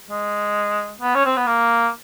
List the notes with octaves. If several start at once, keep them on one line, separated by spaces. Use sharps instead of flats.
G#3
B3
C#4
C4
B3
A#3